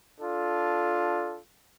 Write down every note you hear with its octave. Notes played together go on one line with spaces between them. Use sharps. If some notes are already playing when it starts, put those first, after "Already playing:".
D4 F4 A4